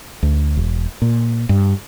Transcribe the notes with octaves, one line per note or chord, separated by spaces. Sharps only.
D2
E1
A#2
G2